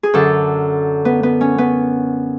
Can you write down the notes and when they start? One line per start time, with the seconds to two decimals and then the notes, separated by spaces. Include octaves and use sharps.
0.03 G#4
0.14 F#2 D3 A4
1.05 B3
1.23 B3
1.41 C#4
1.58 B3